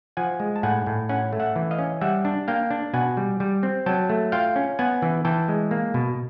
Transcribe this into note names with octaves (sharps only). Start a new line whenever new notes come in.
F3 F#5 G#5
G#3
A5
A2 F#5 G#5
A2
C#4 F#5 G#5
A3
E5 F#5
E3
D#5 F5
C#4
G3 E5 F#5
D4
A#3 F5 G5
D4
B2 F#5 G#5
G3
G3
C4
F#3 G5 A5
A3
F4 F5 G5
C#4
B3 F#5 G#5
E3
E3 G5 A5
G#3
A#3
B2